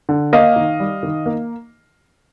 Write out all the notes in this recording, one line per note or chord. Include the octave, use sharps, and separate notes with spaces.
D3
A#3 D#5 F5
D#3
G3
D#3
A#3